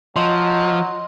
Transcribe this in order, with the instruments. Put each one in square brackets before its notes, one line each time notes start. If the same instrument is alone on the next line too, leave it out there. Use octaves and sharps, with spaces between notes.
[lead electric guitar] F3 [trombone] F#3 [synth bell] D#5 [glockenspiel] C6